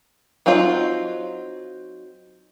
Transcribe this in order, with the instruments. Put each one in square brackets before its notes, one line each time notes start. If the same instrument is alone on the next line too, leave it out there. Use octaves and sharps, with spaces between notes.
[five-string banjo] F#3 C4 D#4 F4